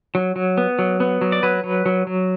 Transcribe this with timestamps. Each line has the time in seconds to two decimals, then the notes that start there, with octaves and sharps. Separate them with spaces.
0.15 F#3
0.36 F#3
0.58 B3
0.79 F#3
1.00 B3
1.21 F#3
1.32 D5
1.43 F#3 B4
1.64 F#3
1.86 F#3
2.07 F#3